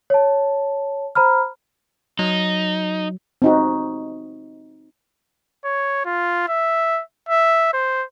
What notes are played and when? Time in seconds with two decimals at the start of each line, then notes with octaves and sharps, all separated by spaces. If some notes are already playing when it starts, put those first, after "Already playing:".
0.10 C#5 A5
1.15 C5 A#5 B5 F6
2.19 F#3 D#4
3.42 C4 D#4 F#4
5.65 C#5
6.05 F4
6.48 E5
7.29 E5
7.73 C5